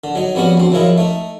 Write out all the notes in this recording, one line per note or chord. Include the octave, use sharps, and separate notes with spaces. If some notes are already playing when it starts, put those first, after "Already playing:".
D3
F#3 D#4
F2 G3 B3 C#4 F#4
D2 C4
F#2 C#3 F3 E4 D#5
A3 D#4